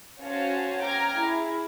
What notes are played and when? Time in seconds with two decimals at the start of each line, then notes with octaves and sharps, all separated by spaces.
0.20 C#4 F#4 C5 C#5 F5 A5
0.80 G5 A#5 D6 F6 G#6
1.14 E4 G#4